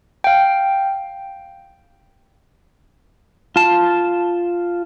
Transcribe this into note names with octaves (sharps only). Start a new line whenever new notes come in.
F5 G5
F4 A5